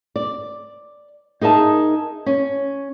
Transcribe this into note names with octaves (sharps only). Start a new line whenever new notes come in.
D5
D#4 G#4 A#4 E5 A5
C#4